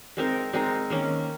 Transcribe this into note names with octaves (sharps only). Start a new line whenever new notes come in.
G#3 C4 D#4 A#4
G#3 C4 D#4 A#4
D#3 A#3 C#4